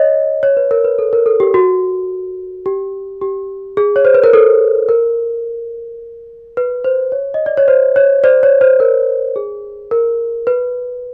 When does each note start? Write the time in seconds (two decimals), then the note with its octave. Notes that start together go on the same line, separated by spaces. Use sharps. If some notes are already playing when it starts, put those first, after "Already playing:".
Already playing: C#5 D#5
0.43 C#5
0.57 B4
0.71 A#4
0.84 B4
0.99 A4
1.13 A#4
1.26 A4
1.40 G4
1.54 F#4
2.66 G4
3.22 G4
3.77 G#4
3.96 C#5
4.05 C5
4.14 B4
4.24 A#4
4.33 A4
4.89 A#4
6.57 B4
6.84 C5
7.12 C#5
7.34 D#5
7.46 D5
7.57 C#5
7.68 C5
7.96 C#5
8.24 C5 D5
8.43 C#5
8.61 C5
8.80 A#4
9.36 G#4
9.91 A#4
10.47 B4